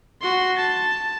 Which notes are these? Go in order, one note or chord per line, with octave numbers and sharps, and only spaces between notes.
F#4 C6
A5